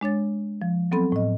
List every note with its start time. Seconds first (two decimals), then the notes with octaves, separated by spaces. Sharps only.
0.01 G#3 D4 C#5 A6
0.62 F3
0.92 F#3 B3 C4 A4 B5
1.12 A2 D#5